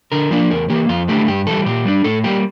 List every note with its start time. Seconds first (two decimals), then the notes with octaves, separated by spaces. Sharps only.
0.12 D3 A#4
0.31 F3 A#3 D4
0.51 E2 A#4
0.70 E3 A#3 G4
0.89 F2 F4
1.08 D3 A3 E4 G4
1.28 G2 G4
1.47 E3 G3 A4
1.66 A#2 G4
1.85 G3 D4
2.04 A2 A4
2.24 G3 A#3 G4